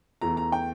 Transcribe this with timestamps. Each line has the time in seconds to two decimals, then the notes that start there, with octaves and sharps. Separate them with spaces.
0.21 E2 E3 A3 A#5
0.37 A#5
0.52 G5